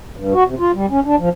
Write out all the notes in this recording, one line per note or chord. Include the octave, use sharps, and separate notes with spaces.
G2
F#4
C3
F4
G3
C#4
D4
F3